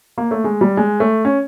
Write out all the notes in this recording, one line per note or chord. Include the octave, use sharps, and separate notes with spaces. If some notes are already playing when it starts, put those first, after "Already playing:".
A#3
A3
G#3
G3
G#3
A3
C#4